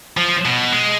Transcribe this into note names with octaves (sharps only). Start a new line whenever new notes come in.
F3
B2
G#3